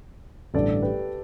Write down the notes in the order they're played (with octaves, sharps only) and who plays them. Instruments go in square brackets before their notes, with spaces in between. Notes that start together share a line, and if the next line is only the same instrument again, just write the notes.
[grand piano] A1 G2 D3 A3 [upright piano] A4 D5
[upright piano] G4 B4